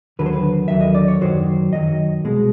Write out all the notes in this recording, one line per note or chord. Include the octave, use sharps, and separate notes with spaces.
D#2 D3 F#3 B4
C5
B4
D#2 D3 F#3 E5
D#5
D5
C#5
F#2 D#3 F#3 C5
F#2 D#3 F#3 D#5
C2 B2 G#3